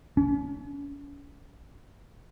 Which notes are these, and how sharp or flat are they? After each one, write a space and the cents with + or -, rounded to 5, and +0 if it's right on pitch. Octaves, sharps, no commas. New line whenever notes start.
C#4 +40